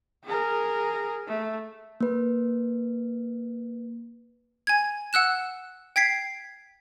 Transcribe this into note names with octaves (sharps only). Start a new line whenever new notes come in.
G#4 A#4
A3
A#3 B4
G#5 G#6
F#5 E6 F#6 E7
G5 G#6 B6 C7